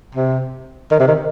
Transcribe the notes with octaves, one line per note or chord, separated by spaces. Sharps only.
C3
D#3
C3
D#3